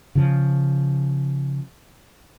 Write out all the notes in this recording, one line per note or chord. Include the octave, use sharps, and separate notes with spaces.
C#3 F3